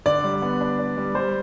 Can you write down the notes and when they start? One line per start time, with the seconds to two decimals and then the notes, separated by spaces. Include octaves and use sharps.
0.06 D3 D5
0.24 G3
0.42 B3
0.61 D4
0.79 D4
0.97 G3
1.15 G3 C5